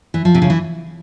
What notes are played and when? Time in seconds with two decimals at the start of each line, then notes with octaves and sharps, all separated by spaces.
0.14 E3
0.25 F3
0.34 C3
0.42 C#3
0.50 E3